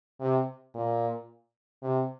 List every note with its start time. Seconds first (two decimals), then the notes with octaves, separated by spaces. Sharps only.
0.20 C3
0.75 A#2
1.83 C3